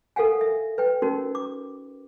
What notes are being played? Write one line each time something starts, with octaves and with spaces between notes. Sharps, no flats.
A4 A#4 F5 F#5 G#5
E5
B4 G5
C#4 D#4 F#4 A#4
D6